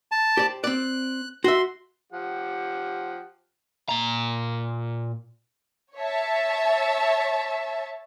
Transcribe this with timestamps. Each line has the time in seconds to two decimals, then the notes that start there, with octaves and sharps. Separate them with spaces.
0.12 A5
0.37 G4 C5 D5
0.64 C4 D5 F#6
1.44 F#4 E5 C6
2.12 F3 G4 F#5
3.89 A#2 A#5
5.97 C#5 E5 A5